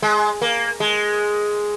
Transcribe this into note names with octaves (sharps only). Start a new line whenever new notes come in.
G#3
A#3
G#3